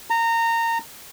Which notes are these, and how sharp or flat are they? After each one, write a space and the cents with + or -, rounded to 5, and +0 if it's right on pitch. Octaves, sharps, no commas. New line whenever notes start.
A#5 -20